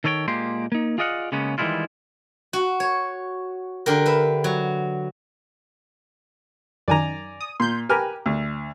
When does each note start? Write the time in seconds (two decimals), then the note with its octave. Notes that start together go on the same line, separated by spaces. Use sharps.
0.04 D#3 A4 C#5 D5 G5
0.28 A#2 G#3 A#3 G4 C6
0.72 A#3 D#4
0.98 F4 G#4 D5 D#5 F5 F#5
1.32 C#3 G#3 A#3 B3 C#4
1.58 D#3 E3 G3 G#3 E4 F4
2.53 F#4
2.80 C#5
3.86 D3 G4 A#4
4.06 B4 E5
4.44 F#3
6.88 F#2 D#3 D5 G#5 A#5
7.40 D#6
7.60 A#2 C6 G6
7.89 G4 A#4 B4 G#5 F6
8.26 D2